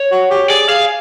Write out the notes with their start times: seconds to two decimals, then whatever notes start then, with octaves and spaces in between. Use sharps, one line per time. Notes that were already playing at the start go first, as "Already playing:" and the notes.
Already playing: C#5
0.12 F#4
0.31 G4
0.49 G#4 D5
0.68 G#4 F5